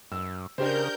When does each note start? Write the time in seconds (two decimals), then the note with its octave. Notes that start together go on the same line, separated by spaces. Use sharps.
0.12 F#2 E6
0.58 C#3 D4 G4 A#4 C5 G6